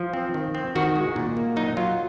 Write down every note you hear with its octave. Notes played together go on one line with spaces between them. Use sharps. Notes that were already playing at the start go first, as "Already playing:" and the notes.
Already playing: F3
C4
D#3
C4
D#3 F#4
G#3
A#2
A#3
F#3 D#4
F#3 F4